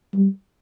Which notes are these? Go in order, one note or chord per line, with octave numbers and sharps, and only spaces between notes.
G3